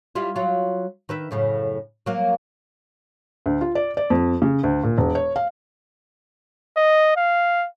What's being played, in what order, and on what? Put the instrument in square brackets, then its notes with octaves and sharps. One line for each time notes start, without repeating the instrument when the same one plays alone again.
[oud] G3 E4 F4
F#3 F4
D#3 B4 E5
F#2 A2 C#3
F#3 A#3
[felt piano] D2
F4
D5
D5
F2
C#3
D2
A#2
E1
C#5
F5
[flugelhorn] D#5
F5